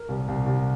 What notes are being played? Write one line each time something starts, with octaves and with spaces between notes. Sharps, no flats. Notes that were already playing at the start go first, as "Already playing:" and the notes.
Already playing: A#4
C2
C2
C2